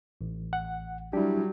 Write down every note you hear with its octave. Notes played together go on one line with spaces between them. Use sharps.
A1
F#5
F#3 G3 D4 E4 G4